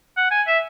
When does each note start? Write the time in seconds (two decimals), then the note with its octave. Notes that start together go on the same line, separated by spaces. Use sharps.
0.17 F#5
0.31 G#5
0.47 E5